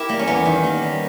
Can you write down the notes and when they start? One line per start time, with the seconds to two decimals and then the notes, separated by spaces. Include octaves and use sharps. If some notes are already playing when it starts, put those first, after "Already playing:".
Already playing: E4 G4 A#4
0.09 G3 A#3
0.19 C#4
0.27 E2 B3
0.45 D#3
0.63 A#3
0.82 G3